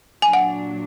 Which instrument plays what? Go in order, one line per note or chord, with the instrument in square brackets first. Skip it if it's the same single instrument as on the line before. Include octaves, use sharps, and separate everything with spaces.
[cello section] A#2 F#3 D4 [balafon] G#5
[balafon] F#5